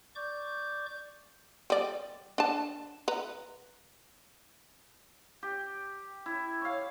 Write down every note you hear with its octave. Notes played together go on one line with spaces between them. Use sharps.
D5 C#6 D6 G6
G3 D5
D4 A5
B4 A#5
G4
E4
C#5 F5